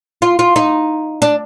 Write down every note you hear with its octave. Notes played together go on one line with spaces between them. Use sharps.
F4
F4
D#4
D4